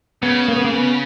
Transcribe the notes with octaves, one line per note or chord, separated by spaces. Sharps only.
C#3 B3
A#3
B3
A#3
B3